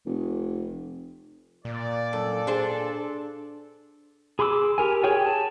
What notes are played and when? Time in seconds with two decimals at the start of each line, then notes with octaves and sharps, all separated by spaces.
0.06 F1
1.65 A#2 D5
2.13 F#2 A4
2.47 D4 G#4 C5
4.39 G#4 B5 C6 D6 E6
4.78 G4 A#4 G#5
5.03 G4 G#4 C#5 G5 G#5
5.26 A5